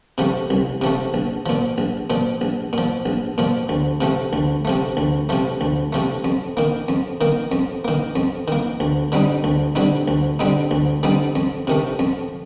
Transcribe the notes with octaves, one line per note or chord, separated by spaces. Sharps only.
C3 F3 A3
C2
C3 F3 A3
A#1
A#2 F3
A#1
A#2 F3
A#1
A#2 F3
A#1
A#2 F3
D2
C3 F3 A3
D2
C3 F3 A3
D2
C3 F3 A3
D2
C3 F3 A3
F2
D#3 A#3
F2
D#3 A#3
F2
D#3 A#3
F2
D#3 A#3
D2
D3 G3 C4 D#4
D2
D3 G3 C4 D#4
D2
D3 G3 C4 D#4
D2
D3 G3 C4 D#4
F2
C3 D#3 A3
F2